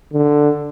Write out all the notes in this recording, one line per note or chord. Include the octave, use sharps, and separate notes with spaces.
D3